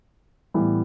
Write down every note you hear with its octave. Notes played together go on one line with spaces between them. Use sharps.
A2 E3 G3 B3